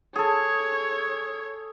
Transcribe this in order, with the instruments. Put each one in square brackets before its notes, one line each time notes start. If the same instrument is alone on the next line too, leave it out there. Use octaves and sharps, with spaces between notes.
[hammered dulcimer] G#4 A4 [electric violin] C#5 G#6